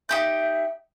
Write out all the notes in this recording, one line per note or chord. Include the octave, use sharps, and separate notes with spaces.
D#4 G4 E5 G6